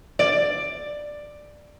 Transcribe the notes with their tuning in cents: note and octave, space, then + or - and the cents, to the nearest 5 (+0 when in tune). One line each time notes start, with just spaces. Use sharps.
D5 +10